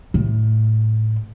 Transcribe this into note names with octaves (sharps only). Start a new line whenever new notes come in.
A2